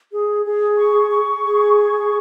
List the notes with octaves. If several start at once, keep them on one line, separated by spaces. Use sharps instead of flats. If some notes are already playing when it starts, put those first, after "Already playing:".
G#4
G#4
C#6
C#6
G#4
C#6